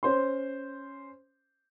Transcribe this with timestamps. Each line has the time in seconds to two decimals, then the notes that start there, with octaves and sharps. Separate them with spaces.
0.03 C#4 C5 C6